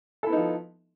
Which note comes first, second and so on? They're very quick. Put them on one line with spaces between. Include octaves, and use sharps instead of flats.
A4 E4 B3 D#4 F3